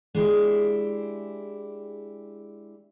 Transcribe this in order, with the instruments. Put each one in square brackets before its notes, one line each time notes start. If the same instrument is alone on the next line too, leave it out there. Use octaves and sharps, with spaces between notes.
[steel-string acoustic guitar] G#3 D4 E4 G4